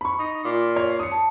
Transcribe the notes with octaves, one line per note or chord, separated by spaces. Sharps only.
B5 C#6
D#4
A#2
C#5
D#6 C#7
A5